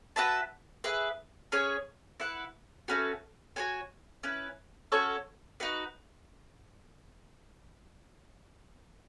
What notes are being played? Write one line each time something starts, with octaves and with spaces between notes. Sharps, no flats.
F#4 B4 E5 A5
E4 G#4 B4
C#4 G#4 C#5
E4 B4 F#5
A3 C#4 F#4 B4
F#4 A4 C#5 G#5
C#4 E4 B4
C#4 F#4 A4 C#5
D#4 F#4 B4